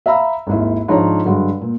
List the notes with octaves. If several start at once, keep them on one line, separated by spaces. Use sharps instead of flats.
E5 F5 A#5 B5 E6
G#1 D#2 E4
G#2 F3 D4 C#5 A#5
G2 D3 F#3 G#3
A#2